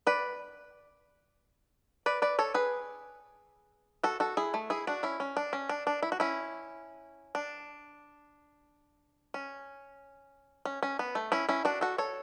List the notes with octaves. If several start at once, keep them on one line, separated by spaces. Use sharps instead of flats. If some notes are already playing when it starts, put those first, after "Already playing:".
B4 D5
B4 D5
B4 D5
A4 C#5
G#4 B4
F#4 A4
F#4 A4
E4 G#4
A3
E4 G#4
D4 F#4
C#4 E4
C#4
D4
C#4
D4
D4
E4
F#4
C#4 E4
D4
C#4
C#4
C#4
B3
A3
C#4 E4
C#4 E4
D4 F#4
F#4 A4
A4 C#5